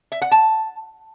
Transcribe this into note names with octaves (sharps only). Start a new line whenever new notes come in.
E5
F#5
A5